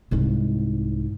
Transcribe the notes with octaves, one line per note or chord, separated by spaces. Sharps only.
C2 G#2